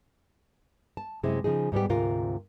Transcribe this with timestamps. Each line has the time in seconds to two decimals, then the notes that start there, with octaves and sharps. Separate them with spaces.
0.97 A5
1.23 F#2 C3 G#3 E4 C5
1.44 C#3 F3 D#4 G#4
1.72 G#2 G3 B3 G4
1.89 D2 G#2 C3 F4 A#4